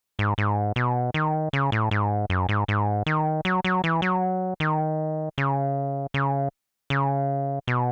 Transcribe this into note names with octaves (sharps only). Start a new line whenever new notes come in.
G#2
G#2
B2
D#3
C#3
A2
G#2
F#2
G#2
G#2
D#3
F#3
F#3
E3
F#3
D#3
C#3
C#3
C#3
B2